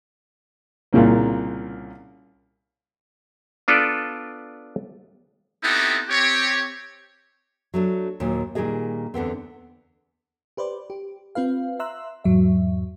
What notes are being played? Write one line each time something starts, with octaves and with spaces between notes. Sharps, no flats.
C2 A#2 C#3 A#3
B3 D4 F4 A4 B4 D5
B3 C4 D#4 E4 G4 A4
C4 G4 C#5
F#3 A3 D4
D#2 A#2 F#3
A#2 D#3 G3 G#4 D#5
E2 D3 B3 C4
G4 B4 C5 D5
G4
C4 F4 B4 F5
E5 A#5 C6 E6 F#6
E2 G#2 F#3 E5